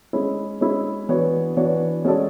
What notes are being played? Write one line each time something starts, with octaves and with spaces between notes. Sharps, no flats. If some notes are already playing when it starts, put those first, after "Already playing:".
G#3 C#4 E4
G#3 C#4 E4
E3 B3 D4 F#4 C#5
E3 B3 D4 F#4 C#5
G#3 C#4 F#4 A4 D5